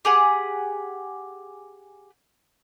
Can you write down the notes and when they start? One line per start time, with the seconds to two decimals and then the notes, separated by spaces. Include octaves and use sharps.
0.05 G4 G#4 F#5